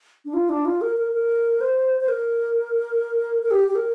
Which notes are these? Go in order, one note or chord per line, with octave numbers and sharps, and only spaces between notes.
D4
F4
D4
F4
A#4
A#4
A#4
C5
C5
A#4
A#4
G4
G4
A#4